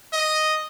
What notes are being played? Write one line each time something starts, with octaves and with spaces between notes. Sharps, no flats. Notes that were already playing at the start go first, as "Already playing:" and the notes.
D#5